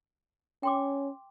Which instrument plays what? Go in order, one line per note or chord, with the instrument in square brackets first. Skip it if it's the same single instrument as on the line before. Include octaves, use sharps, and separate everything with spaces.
[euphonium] C#4 [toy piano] G5 C6 D6